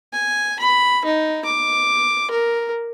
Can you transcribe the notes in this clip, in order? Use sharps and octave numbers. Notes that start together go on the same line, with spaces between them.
G#5
B5
D#4
D6
A#4